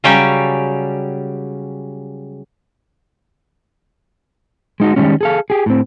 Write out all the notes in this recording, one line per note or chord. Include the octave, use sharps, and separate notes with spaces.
C#3 F#3 G3 C#4 D5 G5
G#3 D#4 F#4
D#3 E3 G3 G#3 C#4
G#4 A4 F5
G4 G#4
A2 C4